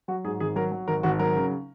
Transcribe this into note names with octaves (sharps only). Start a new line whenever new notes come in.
F#3 F#4
G#2 G#4
G#1 G#4
F#3 A#4
F#3
G#1 A#4
G#1 F#4
F#3 A#4
C#3